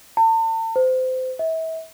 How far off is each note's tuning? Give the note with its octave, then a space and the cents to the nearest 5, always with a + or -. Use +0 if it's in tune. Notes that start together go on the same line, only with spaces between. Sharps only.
A5 +40
C5 -25
E5 -35